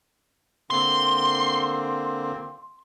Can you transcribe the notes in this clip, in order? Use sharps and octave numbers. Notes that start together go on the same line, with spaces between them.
D3 A#3 C4 C6